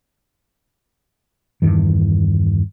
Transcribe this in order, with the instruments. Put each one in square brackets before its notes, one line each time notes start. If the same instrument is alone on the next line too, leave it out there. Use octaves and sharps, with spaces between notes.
[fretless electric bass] E2 G2 D#3 E3